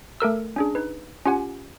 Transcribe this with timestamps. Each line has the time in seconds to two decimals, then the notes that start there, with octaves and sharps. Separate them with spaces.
0.20 A3 A4 A#4 E6
0.56 C#4 D4 G#4
0.75 D#4 B4
1.26 C#4 F4 G4 F#5 G#5